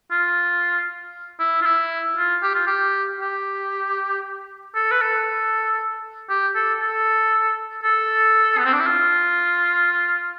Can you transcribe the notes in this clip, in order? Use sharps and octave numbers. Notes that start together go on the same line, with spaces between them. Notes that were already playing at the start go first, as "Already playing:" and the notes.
F4
E4
F4
E4
F4
G4
F4
G4
G4
A4
B4
A4
G4
A4
A4
A4
B3
C4
D4
E4
F4